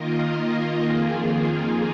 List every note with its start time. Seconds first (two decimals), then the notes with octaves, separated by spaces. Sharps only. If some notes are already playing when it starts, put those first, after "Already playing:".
Already playing: D#3 A#3 F4 A#4 D#5
0.86 F2 D#3 A#3 F4 G#4